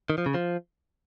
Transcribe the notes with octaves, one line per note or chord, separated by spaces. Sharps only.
D#3
F3
C#3
F3